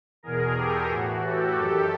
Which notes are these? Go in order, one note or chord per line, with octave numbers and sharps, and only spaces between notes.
E2 B2 G#4 A#4
G4 A4
A2 E3 F#4
G4 A4
F#2 D#3 G4 A4